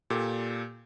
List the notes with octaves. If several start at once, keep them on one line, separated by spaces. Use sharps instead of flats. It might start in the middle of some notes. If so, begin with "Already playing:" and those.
A#2 G4 A4